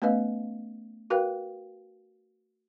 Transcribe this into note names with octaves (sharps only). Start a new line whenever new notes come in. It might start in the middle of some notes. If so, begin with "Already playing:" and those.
A3 B3 C#4 B4 D#5 F5
F#4 A#4 B4 F5 G5